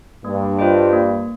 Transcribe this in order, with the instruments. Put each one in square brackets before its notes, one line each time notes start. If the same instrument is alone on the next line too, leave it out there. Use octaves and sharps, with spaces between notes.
[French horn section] G2 [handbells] A#3
[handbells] F4 C5 D#5 G5
A#3